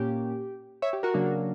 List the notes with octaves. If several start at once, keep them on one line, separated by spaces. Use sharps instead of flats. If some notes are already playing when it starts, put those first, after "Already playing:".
Already playing: A#2 A#3 C#4 G4
C#5 E5
G4
F#4 A#4
C#3 F#3 A#3 D4